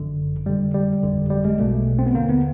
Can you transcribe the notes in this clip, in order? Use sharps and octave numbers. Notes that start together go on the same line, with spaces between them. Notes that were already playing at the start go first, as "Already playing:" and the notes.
Already playing: G1 F#2 D3
F2 D3 G3
G3
G1 F2 D3
G3
G#3
B1 B2 A3
C4
B3
D#2 D3 A#3
B3